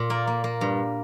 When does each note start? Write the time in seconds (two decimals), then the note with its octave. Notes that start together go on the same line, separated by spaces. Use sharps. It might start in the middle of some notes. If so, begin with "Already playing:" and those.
Already playing: A#2
0.10 A#3 D5
0.27 A#3
0.44 A#3
0.61 G2